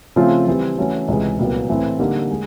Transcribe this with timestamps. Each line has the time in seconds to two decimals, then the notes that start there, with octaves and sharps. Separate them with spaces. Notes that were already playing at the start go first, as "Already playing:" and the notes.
0.16 C#3 F3 A3 C4 F4
0.47 E3 G3 C4
0.78 E3 A3 C#4 F#4
1.08 C#2 C3 E3 G#3
1.39 C2 A#2 F#3 B3
1.69 A2 E3 A3 C4
1.99 D3 G3 A#3 D#4 G4
2.30 G#3